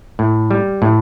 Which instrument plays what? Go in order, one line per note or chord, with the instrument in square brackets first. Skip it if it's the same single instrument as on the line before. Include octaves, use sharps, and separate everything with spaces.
[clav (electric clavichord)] A2
G3
A2